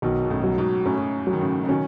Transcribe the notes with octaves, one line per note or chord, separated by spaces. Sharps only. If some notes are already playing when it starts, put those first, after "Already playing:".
B1 B2 D#3
B2
A2 C#3
F#3
G#2 B2
F#2 A2 C#4
F#3
D#3
A2 C#3
C#3
B2 D#3 C#4